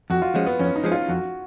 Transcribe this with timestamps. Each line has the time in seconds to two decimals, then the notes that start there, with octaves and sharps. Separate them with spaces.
0.10 F2 F#4
0.22 F4
0.35 F3 G#3 C#4
0.47 B3
0.59 F2 C#4
0.76 D#4
0.84 F3 G#3 C#4
0.92 F4
1.09 F2 F#4